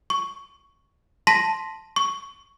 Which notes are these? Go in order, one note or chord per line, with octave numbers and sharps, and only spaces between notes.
C#6
A5 C6 A#6 B6 D#7
C#6